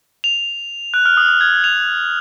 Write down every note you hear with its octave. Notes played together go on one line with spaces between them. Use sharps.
F7
F#6
F6
D#6
F6
G#6
F7